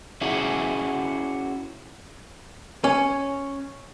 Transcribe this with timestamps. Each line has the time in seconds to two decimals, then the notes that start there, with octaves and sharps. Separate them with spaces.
0.21 C#4 E4 F#4 G#4 D5
2.84 C#4